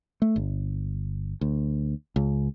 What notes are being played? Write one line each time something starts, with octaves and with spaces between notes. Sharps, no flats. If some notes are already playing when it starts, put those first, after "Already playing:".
A3
G1
D2
C#2